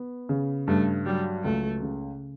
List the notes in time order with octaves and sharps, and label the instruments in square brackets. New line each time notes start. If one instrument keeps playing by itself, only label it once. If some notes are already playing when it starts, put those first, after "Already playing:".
Already playing: [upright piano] B3
C#3
[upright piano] G2 [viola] A3
[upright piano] F#3 [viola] G3
[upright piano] C#2 [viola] A3
[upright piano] C#3